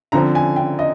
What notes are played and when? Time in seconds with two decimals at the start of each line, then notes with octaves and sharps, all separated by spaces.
0.12 D3 F3 C4 A#5
0.35 G#5
0.56 G5
0.79 D#5